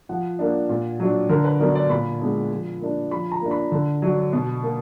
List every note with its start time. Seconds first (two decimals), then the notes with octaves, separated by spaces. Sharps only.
0.09 F3 F#5
0.39 A#3 D4
0.69 A#2
1.00 F#3 D4
1.29 D3 A#4
1.44 B4
1.60 F#3 B3 D4 A#4
1.75 D5
1.90 A#2 B5
2.21 G#3 B3 D4
2.51 F3
2.81 A#3 D4
3.11 F3 B5
3.32 A#5
3.42 A#3 D4
3.51 B5
3.72 D3
4.02 F#3 D4
4.33 B2
4.63 A#3